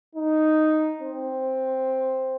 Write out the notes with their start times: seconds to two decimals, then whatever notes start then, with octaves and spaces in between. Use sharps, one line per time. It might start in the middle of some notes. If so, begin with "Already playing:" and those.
0.15 D#4
1.01 C4